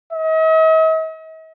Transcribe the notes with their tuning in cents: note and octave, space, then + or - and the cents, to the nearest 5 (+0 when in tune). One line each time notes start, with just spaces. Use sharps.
D#5 +45